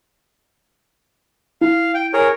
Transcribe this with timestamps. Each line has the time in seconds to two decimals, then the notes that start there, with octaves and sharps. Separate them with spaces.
1.61 E4 F5
1.94 G5
2.14 G#4 A#4 C#5